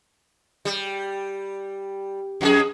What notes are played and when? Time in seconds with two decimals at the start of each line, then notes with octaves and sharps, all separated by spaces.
0.65 G3
2.41 F2 F4 G#4